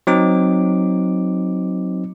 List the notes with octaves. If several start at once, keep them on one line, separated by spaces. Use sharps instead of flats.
F#3 C4 D#4 D6